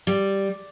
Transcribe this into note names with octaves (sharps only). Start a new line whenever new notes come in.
G3